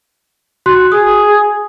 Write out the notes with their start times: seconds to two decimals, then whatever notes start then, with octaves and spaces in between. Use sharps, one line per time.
0.66 F#4 C6 F#6
0.92 G#4 D#6